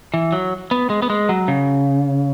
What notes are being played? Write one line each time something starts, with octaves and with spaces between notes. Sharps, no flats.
E3
F#3
B3
G#3
B3
G#3
F#3
C#3